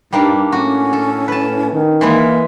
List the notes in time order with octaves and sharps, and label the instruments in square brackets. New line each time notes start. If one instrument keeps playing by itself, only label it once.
[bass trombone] G2 [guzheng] G3 A#3 D4 [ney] D#4
[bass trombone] A2 [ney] C#4 [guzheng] F#4
[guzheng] A4
B4 A5
[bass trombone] D#3
[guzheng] E3 G#3 E4 [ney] A#3